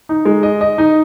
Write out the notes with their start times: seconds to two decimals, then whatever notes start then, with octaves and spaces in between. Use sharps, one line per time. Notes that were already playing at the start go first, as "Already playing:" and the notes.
0.09 D#4
0.25 G#3
0.43 D#5
0.61 D#5
0.78 D#4